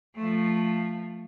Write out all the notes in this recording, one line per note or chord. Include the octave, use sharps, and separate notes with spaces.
F3 A3